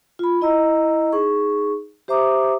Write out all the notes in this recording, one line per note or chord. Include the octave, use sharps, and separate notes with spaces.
F4 B5
E4 D#5 A#5 E6
D#4 G#4 C#6
G4 C5 E5 A#5 D6 D#6